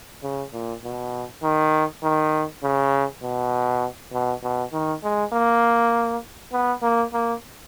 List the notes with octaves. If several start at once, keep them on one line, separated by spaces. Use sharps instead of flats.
C#3
A#2
B2
D#3
D#3
C#3
B2
B2
B2
D#3
G#3
A#3
B3
A#3
A#3